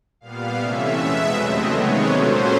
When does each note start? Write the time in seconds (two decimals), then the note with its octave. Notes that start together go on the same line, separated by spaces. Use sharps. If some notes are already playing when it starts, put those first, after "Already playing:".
0.21 A#2 G3 B3 F5
0.58 C3 E3 A3 C#4 E5
0.96 E2 B2 G#3 B3
1.33 D#2 C#3 F#3 A3 C4 D#5
1.71 C3 D#3 G#3 B3 C#5
2.08 A#2 F#3 A3 C#4 C5